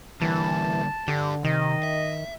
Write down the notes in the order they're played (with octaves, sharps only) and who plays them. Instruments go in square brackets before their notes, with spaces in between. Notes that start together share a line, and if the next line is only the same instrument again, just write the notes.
[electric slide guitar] D3 G3 A#3 [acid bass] E3 [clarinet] A5
[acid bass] D3 [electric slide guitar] D4 G4
[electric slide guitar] C3 [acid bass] D#3 [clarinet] D#5
[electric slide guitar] E5